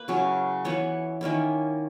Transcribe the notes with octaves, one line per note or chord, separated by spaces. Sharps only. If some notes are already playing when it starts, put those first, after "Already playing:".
Already playing: A#3 B4
C#3 F#3 C#4 E4
E3 B3 E4 C#5
D#3 A#3 C#4 E4